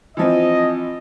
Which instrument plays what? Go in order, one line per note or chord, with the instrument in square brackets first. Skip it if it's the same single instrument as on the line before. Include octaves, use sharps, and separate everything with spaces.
[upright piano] E3 F3 C4 [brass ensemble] D#5